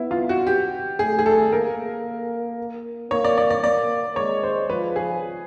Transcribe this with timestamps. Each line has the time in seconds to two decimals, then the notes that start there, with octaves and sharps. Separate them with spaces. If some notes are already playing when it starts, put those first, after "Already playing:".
Already playing: B3 E4
0.11 F4
0.29 F#4
0.47 G4
0.99 A3 G#4
1.19 G#4
1.26 A4
1.52 A#3 A#4
3.10 A#3 C#5
3.24 D5
3.38 D5
3.50 D5
3.64 A#3 D5
4.16 G#3 C#5
4.43 C5
4.70 F3 B4
4.96 G#4